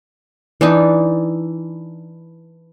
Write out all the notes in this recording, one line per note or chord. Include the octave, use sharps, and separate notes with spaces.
E3 D4 D#4